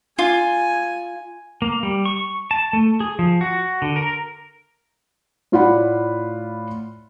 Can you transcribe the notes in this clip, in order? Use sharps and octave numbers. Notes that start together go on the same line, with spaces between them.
F4 G#5
A#3
G3
C#6
A5
A3
G#4
F3
F#4
D3
A#4
A2 F4 D5 F#5 B5